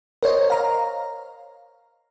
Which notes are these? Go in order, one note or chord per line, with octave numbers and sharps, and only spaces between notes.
A#4 C5 C#5 D#5
F5 A#5